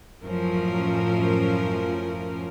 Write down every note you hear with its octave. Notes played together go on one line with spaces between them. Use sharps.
F#2 A2 F3 C#4 A#4